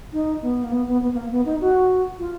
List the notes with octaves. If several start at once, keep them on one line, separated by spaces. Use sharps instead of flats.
D#4
B3
A#3
B3
B3
B3
B3
A#3
B3
D#4
F#4
F4